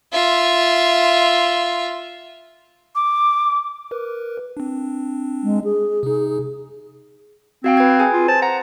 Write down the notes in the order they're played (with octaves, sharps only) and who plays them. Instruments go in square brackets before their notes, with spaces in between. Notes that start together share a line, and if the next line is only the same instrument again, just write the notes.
[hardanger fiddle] F4 E5
[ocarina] D6
[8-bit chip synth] A#4 B4
C4 D4
[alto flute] G#3
G#4
[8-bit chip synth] C3 D#4
[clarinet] C4 [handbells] F#4 F5 G5
[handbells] B4 G#6
G#4 G#5
[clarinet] F4
[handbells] C5 [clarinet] A5
[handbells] F#5 [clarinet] A#5